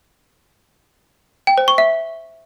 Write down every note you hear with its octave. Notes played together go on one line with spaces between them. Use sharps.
G5
C5
C#6
E5